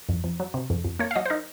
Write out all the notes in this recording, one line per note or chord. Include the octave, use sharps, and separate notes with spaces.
F2
F2
F#3
C3
F2
F2
A#3 C#5
F5
F#3 D#5
C5
D#4 A#4